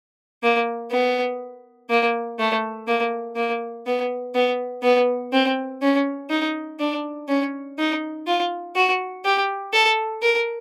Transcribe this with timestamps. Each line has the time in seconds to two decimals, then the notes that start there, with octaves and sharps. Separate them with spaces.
0.43 A#3
0.91 B3
1.90 A#3
2.39 A3
2.87 A#3
3.36 A#3
3.86 B3
4.35 B3
4.83 B3
5.33 C4
5.82 C#4
6.30 D#4
6.79 D4
7.28 C#4
7.78 D#4
8.27 F4
8.76 F#4
9.25 G4
9.73 A4
10.22 A#4